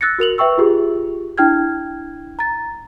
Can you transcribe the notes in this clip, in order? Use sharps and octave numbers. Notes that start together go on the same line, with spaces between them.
E6 F#6 A6 A#6 C#7
F#4 A#4 F7 F#7
B4 E5 G5 C#6 E6
F4 G4 G#4
D4 E4 G5 F6 G#6
A#5 A6